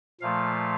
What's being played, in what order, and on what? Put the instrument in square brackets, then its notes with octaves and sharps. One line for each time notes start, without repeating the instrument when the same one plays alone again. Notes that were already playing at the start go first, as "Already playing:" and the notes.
[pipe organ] A#2 F3 A3 F5